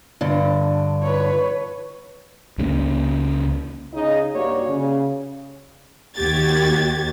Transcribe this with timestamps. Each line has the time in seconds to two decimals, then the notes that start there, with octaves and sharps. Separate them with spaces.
0.21 G2 D3
1.02 B4 C#5
2.58 C#2 C#3 F3 A#3
3.94 C#3 D#4 D#5
4.34 G2 A#3 F#4 G4 C#5 D5
4.68 C#3
6.16 D#2 D#3 F#4 G4 G#6 A6